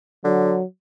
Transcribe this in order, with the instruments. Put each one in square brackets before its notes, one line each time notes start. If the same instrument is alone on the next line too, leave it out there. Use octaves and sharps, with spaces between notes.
[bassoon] D3 [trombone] F#3